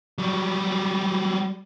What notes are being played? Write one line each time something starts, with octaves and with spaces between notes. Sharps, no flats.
F#3 G3